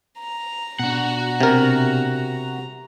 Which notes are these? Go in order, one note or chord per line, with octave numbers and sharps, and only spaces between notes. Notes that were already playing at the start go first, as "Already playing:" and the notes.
A#5
B2 D4 F#4 F#5
C3 A#4